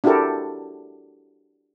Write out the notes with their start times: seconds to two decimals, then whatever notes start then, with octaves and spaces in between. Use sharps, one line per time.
0.04 D4 E4 F#4 G4 A4 A#4